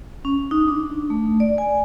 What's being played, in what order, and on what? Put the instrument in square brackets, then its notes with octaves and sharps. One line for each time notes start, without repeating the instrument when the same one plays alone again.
[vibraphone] C#4
D#4
D4
A3
D5
G#5